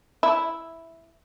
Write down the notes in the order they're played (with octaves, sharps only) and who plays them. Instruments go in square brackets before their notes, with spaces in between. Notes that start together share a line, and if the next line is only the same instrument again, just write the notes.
[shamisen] E4